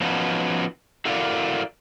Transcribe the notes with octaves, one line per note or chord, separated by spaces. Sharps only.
F3 B3 C#4 D#4 F#4
E4 F#4 A4 A#4 D5 F5